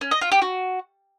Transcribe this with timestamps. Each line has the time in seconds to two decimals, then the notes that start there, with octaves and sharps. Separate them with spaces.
0.01 C#4
0.11 D#5
0.21 F4
0.32 G4
0.42 F#4